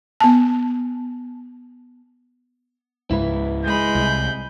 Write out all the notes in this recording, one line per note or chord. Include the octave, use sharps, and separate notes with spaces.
B3 A5
C#2 G#2 E4 B4
G#3 B5 G6
C2